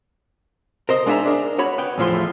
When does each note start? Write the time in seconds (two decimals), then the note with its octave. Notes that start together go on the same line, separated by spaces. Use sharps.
0.89 A#4 C5 D#5
1.06 G#3 D4 D#4 D#5 E5 A#5
1.25 D4 A#4
1.58 F#4 C#5 B5
1.78 B3 G5
1.98 E2 A2 F3 A3 C6